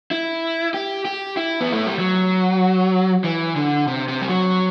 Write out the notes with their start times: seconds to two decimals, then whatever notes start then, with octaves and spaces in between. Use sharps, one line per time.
0.11 E4
0.74 G4
1.05 G4
1.37 E4
1.61 B3
1.73 A3
1.87 G3
1.99 F#3
3.24 E3
3.56 D3
3.88 C3
4.08 C3
4.22 G3
4.29 F#3